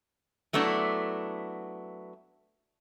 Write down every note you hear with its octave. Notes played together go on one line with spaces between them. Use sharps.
F#3 A3 B3 D4 E4